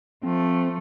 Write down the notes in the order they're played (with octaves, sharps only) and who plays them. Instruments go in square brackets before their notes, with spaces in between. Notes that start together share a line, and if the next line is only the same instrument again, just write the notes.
[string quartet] F3 A3 [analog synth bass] C4